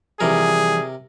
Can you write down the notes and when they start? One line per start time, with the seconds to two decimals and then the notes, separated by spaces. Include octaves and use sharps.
0.21 C3 E3 F3 G3 G#4 A#4